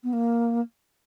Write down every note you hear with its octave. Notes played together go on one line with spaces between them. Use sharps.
B3
A#3